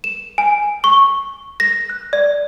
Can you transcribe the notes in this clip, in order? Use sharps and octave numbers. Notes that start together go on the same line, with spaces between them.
E7
G#5
C#6
A#6
F#6
D5